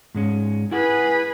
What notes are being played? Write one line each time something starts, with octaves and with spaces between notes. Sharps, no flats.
G#2 G#3 C#4
E4 G#4 B4 F#5